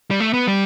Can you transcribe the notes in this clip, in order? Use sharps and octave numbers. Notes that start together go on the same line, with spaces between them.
G3
A3
B3
G3